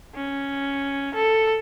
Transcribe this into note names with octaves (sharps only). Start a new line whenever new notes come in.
C#4
A4